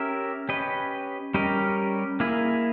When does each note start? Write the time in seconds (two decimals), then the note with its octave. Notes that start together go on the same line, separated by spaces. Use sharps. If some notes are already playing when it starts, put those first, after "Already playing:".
Already playing: C#4 G4 A#4 E5
0.49 C#4 G4 B4 D#5
1.34 G3 C#4 G4 A#4 D#5
2.20 A#3 E4 G#4